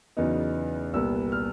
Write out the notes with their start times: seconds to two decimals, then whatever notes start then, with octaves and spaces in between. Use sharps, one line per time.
0.17 E2 C#3 F#3 B3 D#4
0.93 C2 A#2 G3 B3 E6
1.32 F6